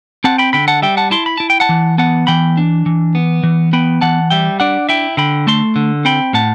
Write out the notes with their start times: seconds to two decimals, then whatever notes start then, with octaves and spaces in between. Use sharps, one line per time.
0.24 C4 F#5 A5
0.38 G5 B5
0.53 D3 G5 B5
0.68 F#5 A5
0.82 G3 E5 G5
0.97 F#5 A5
1.11 E4 A5 C6
1.26 B5
1.37 E4 A5
1.50 G5
1.60 F#5 A5
1.69 E3
1.98 B3 F#5 A5
2.27 E3 G5 B5
2.57 D4
2.86 E3
3.15 B3
3.43 E3
3.73 B3 G5 B5
4.01 E3 F#5 A5
4.30 G3 E5 G5
4.60 D4 D5 F#5
4.89 E4 E5 G5
5.17 D3 G5 B5
5.47 A3 A5 C6
5.76 D3
6.05 C4 G5 B5
6.33 A2 F#5 A5